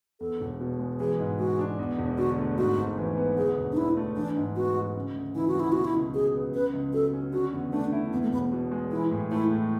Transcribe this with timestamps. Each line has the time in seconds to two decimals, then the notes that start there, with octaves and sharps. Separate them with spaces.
0.20 E2 A4
0.41 E1
0.60 B2
0.79 G#3
0.99 E3 G#4
1.19 G#2
1.39 G#3 F#4
1.59 D4
1.79 E2
1.99 E1
2.18 D3 F#4
2.38 A3
2.57 G#2 F#4
2.78 G#1
2.97 E3
3.17 B3
3.37 D2 G#4
3.58 E1
3.72 D4
3.77 D3 E4
3.97 A3
4.16 E3 D4
4.37 G#2
4.56 B3 F#4
4.76 G#2
4.96 C#3
5.15 D2
5.35 E3 E4
5.48 F#4
5.55 D2 E4
5.72 B2 F#4
5.85 E4
5.95 C#2
6.14 F#3 G#4
6.34 B3
6.54 C#3 B4
6.74 C#2
6.93 F#3 A4
7.13 C#4
7.33 D3 F#4
7.53 E2
7.73 A3 D4
7.92 E4
8.12 E2 B3
8.22 A3
8.32 E1 B3
8.52 B2
8.72 G#3
8.91 E3 E4
9.11 A2
9.31 A3 E4
9.51 A2